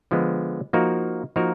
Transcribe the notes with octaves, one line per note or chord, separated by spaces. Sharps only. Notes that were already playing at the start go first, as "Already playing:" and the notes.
D3 F3 G#3 B3
F3 A#3 D#4 F#4 A#4
F3 A#3 D#4 F#4 A#4